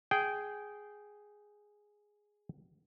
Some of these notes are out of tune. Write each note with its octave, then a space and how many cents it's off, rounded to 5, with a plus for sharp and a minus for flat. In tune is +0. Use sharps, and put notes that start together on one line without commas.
G#4 +0 G5 -15